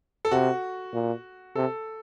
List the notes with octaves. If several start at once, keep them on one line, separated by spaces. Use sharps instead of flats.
A4
C3 F#4
A#2
C3 A4